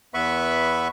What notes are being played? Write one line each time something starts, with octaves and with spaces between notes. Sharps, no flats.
E2 B3 B4 E5 B5 C#6